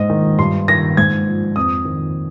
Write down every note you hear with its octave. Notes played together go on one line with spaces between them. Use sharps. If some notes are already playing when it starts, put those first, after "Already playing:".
Already playing: G#2 D#5
D#3
G2 C6
D#3 A#6
G#2 G#6
F3
F2 D#6
D#3